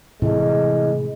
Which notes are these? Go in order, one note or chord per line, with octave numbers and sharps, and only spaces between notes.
A2 C3 E3 G#3